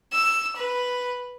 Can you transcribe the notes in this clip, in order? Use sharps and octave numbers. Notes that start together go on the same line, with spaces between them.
E6
B4